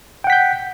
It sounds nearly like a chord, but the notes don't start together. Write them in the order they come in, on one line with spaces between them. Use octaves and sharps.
G5 F#5 B6 G6